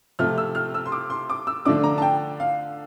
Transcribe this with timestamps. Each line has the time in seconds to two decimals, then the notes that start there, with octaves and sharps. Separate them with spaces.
0.19 C3 F3 A3 F6
0.38 E6
0.55 F6
0.74 E6
0.86 C6
0.92 D6
1.10 C6
1.30 D6
1.47 E6
1.65 D3 F3 A3 D4 D6
1.84 A#5
1.98 A5
2.02 G5
2.40 F5